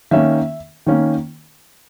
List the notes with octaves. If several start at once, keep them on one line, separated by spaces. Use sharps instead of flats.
D#3 A#3 C#4 E5
D#3 A#3 C#4